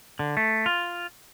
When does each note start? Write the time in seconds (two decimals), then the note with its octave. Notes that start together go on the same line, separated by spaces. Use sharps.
0.19 D3
0.37 A3
0.66 F4